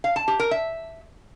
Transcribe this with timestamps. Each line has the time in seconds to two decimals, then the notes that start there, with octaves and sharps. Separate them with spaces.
0.04 F5
0.16 A5
0.28 G4
0.40 A#4
0.51 E5